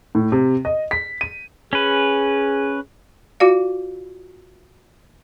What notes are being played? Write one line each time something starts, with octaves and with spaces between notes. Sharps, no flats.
A2
C3
D#5
B6
D#7
C#4 G#4 B4
F4 F#4 D5 F5